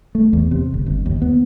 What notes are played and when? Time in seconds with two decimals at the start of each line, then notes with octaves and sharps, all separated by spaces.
0.15 A3
0.33 E2
0.51 C3
0.74 G1
0.86 G1
1.06 D#2
1.22 B3